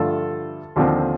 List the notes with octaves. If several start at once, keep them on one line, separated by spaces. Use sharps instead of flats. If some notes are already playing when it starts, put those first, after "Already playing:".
Already playing: G2 D3 F3 A3 F4 A4
D#2 D3 F3 C4